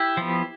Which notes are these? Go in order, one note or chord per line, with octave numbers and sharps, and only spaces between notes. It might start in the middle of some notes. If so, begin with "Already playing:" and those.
Already playing: E4 G4
F3 B3